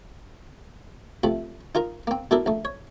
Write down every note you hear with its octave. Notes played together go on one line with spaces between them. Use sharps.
C3 F3 A3 B5
D#4 F4 A#4 A#5
A#3 C4
B2 D4 E4 A4 A#4
A#1 A3
C#5